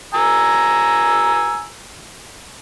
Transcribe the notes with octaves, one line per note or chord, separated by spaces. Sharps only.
G#5 A#5 E6